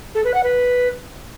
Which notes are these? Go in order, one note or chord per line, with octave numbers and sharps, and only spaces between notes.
A4
B4
F#5
B4